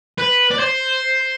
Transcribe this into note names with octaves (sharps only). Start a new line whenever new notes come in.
B4
D5
C5